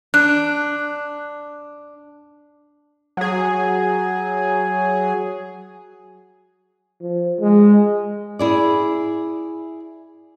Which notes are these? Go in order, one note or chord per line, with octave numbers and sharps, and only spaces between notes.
D4 F#6
F#3 G#4
F3
G#3
E4 G#4 D5